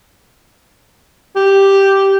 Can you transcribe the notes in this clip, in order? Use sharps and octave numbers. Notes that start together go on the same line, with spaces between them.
G4